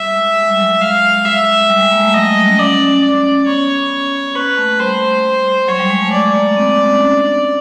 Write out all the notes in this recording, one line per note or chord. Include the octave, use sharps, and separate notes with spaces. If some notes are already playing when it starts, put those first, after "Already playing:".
Already playing: G3 E5
G#3
G#3
G3
F#3
G3
G#3 F5
E5
G3
G#3
A#3
A3
F#3 D#5
G3
C#4
C#4 D5
D5
B3 C#5
A#3 B4
A3
G3 C5
F#3 C#5
G3
G#3
A3
G#3 D5
A#3
C4
C4
C#4
C4
D4
D4